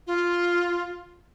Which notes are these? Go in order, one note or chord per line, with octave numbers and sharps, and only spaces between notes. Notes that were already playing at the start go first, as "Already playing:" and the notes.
F4